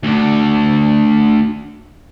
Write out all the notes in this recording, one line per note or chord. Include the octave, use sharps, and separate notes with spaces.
D2 D3